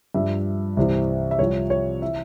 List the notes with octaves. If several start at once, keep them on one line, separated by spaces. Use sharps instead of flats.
G2 F3 E5
C2 C3 E3
E5
C2 C3 F3 C#5
C#5
E3 E5